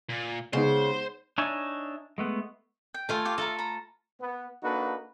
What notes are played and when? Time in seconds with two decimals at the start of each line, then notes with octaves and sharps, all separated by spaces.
0.10 A#2
0.53 C#3 G#3 B3 D#4 C5
1.38 D4 D#4 C#5 E5 G#5
2.18 G#3 A3 B3
2.94 G5
3.09 A3 F4 G#5
3.25 G4 F5
3.38 A4 E5 F5 A#5
3.59 A#5 B5
4.20 B3
4.62 A#3 D4 D#4 F#4 A4 B4